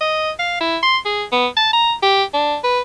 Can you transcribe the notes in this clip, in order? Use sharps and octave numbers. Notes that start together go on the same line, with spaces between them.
D#5
F5
E4
C6
G#4
B3
A5
A#5
G4
D4
B4